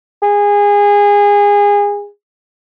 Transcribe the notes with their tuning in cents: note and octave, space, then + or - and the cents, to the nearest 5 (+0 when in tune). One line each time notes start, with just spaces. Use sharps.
G#4 -25